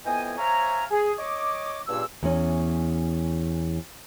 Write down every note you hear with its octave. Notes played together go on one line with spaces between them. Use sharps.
F2 E3 B3 D#5 G5 G#5
C5 C#5 E5 F5 G#5 A#5
G#4
C#5 D#5 D6
C#2 G2 A#2 A#3 G4 E6
E2 C#4